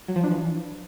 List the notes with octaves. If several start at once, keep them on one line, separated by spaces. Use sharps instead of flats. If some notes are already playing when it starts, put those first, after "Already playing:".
F#3
F3
D4
E3